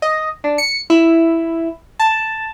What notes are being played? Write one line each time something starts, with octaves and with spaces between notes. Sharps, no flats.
D#5
D4
C#7
E4
A5